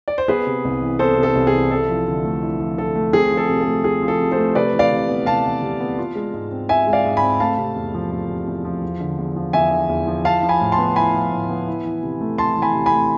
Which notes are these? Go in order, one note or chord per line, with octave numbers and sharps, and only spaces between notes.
D5
C5
B3 G#4 B4
C3
C2
E3
B3 A4 C5
C3
A4
C2
G#4
E3
E4 A4
F3
D3
A3
E4
F3
D3 A4
A3
C4 G#4
F3
A4
C3
A4
A3
C4 G#4
F3
A4
C3
A4 C5
A3
C3 B4 D5
E3
D5 F5
C3
B3
C3 F5 A5
E3
C3
B3
F4
G#3
G#2
C4
F4 E5 G#5
G#3
D5 F5
G#2
G#5 B5
C4
A3 F5 A5
C3
E2
F3
A3
C3
E2
F3
E2
D3
E2
F3
E2 E5 G#5
D3
E2
F3
E4 F5 A5
F3
G#5 B5
A2
A5 C6
B3
E4 G#5 B5
F3
A2
B3
E4
E3
C3
A3
E4 A5 C6
E3
G#5 B5
C3
G#5 B5
A3